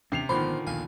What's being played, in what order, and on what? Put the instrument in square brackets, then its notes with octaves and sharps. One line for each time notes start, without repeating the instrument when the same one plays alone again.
[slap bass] D#2 E3 D4 [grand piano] C3 C7 F7 [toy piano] C#4
[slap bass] G#1 F3 B3 [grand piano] A#2 D3 D#3 [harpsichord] C5 [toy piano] B5
[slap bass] A#1 D#2 B2 [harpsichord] F5 G#5